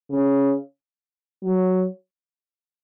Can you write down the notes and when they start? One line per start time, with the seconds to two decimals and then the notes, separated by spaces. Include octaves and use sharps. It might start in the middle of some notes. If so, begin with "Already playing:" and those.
0.10 C#3
1.43 F#3